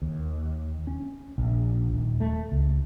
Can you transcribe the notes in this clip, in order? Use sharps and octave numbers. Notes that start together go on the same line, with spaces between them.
D#2
C#4
A#1
D#1
A3
C#2